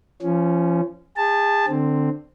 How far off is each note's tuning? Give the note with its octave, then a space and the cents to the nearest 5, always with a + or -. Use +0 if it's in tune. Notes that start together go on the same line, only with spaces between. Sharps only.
F3 -30 C#4 +0
G#4 -35 A5 +0
D3 +20 C4 +0